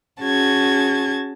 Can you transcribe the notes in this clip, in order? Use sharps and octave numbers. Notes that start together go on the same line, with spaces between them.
C#4 F#4 G#4 A5 G#6